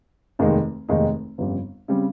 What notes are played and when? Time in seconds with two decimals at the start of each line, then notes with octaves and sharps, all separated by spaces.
0.39 F1 D#2 D#3 G#3 D#4
0.89 F1 D#2 D#3 G#3 D#4
1.38 G1 F2 C#3 G3 C4
1.88 C#3 G3 C4